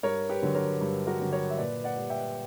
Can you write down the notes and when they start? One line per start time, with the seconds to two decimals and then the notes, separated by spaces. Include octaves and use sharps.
0.03 G2 A#4 C#5
0.29 G4 B4
0.42 D3 F#3
0.55 A#4 C#5
0.81 G2
1.07 F#4 A#4
1.20 D3 F#3
1.32 A#4 C#5
1.50 E5
1.58 A#2 B4 D5
1.84 D5 F#5
1.97 G3
2.10 E5 G5